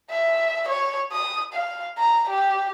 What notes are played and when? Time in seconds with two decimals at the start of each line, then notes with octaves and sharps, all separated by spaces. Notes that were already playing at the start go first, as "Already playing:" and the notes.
0.10 E5
0.69 C#5
1.12 D#6
1.54 F5
1.98 A#5
2.30 G4